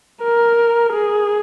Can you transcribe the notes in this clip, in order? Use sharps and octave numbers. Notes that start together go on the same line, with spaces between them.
A#4
G#4